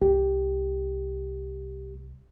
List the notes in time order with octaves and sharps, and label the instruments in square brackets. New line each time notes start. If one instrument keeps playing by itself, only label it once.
[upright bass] C2 [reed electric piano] G4